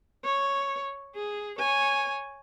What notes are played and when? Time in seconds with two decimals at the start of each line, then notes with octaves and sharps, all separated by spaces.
0.24 C#5
1.15 G#4
1.59 C#5 G#5